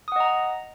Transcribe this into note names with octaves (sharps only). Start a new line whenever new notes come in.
D#5 F#5 A#5 D#6